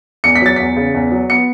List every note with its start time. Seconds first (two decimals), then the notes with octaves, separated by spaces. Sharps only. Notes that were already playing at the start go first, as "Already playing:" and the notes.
0.24 E2 C#7
0.36 B6
0.42 F#3 A6
0.56 E2 B6
0.76 C#3
0.94 E2
1.12 F#3
1.30 B3 C#7